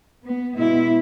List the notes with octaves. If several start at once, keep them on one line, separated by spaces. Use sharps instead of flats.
B3
B2 G#3 B3 E4